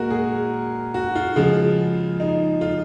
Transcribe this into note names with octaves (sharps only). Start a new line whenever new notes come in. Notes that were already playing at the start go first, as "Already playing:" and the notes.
Already playing: A#2 G#3 F#4 A#4
G#4
F#4
F4
C#3 F3 G#3 F4
D#4
F4